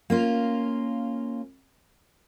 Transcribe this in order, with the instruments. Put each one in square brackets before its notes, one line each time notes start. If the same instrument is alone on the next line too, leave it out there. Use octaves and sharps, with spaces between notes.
[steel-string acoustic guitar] A#3 C#4 F4